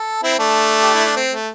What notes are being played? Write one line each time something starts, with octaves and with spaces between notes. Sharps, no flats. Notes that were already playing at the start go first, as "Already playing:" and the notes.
Already playing: A4
C4 E4
A3 D4
G4
E4
D4
C4
A3